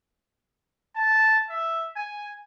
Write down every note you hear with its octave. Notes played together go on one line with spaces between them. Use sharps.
A5
E5
G#5